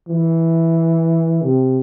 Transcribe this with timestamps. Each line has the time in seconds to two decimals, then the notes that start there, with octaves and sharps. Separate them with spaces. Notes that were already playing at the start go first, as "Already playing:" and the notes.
0.08 E3
1.42 C3